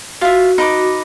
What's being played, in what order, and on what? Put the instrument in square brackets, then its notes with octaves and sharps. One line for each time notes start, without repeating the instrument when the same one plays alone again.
[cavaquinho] F4 E5 [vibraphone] F#4
[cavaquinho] D#4 B4 D6